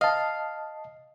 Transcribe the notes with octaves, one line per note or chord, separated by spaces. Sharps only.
D#5 F5 A5